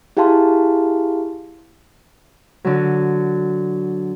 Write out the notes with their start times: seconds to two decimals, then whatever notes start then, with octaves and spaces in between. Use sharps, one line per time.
0.17 E4 G4 G#4 F5 A5 C6
2.64 D3 F#3